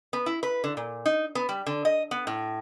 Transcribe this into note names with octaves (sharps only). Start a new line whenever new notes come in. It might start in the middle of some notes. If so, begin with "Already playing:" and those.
B3
E4
B4
D3
A#2
D#4
B3
G3
D3
D#5
B3
A2